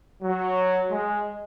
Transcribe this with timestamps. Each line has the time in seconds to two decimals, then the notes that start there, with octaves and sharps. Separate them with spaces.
0.22 F#3
0.90 G#3